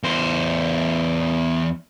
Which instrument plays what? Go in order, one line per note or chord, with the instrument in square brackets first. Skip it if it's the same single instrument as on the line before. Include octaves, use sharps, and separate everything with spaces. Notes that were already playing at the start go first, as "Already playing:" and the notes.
[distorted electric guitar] E2 C5